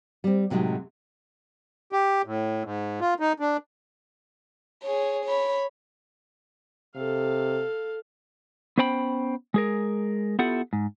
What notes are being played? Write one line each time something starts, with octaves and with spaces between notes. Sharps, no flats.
G3 C4
A2 C3 F#3 G#3 D#4
G4
A2
G#2
F4
D#4
D4
G#4 C#5
C#5 B5
C3 A4 F5
B3 C#4 C5 G5 B5
G#3 G#4 A#4
B3 E4 F4 G4 A4 F#5
G#2